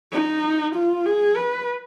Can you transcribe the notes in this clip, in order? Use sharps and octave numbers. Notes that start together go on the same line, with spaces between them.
D#4
F4
G#4
B4